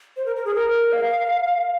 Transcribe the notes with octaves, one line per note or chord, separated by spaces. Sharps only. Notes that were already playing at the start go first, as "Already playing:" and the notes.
C5
A#4
A#4
G#4
A#4
F5